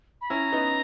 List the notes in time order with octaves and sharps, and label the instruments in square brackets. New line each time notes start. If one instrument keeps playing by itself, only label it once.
[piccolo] B5
[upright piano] C#4 E4 [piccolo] A#5
[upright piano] B3 D#4